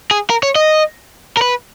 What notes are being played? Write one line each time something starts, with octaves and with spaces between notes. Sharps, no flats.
G#4
A#4
C#5
D#5
A#4
B4